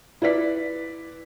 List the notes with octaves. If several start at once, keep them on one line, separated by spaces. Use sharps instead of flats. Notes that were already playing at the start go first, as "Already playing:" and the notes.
E4 B4 D5 B6